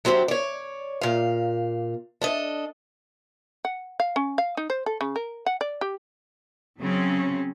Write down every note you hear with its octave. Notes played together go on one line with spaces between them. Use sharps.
F#3 C4 D4 F#4 G4
C#5 D5
A#2 F5
D4 A4 D#5
F#5
F5
C#4
F5
D#4
C5
A4
C#3
A#4
F#5
D5
G4
C#3 F#3 C4 C#4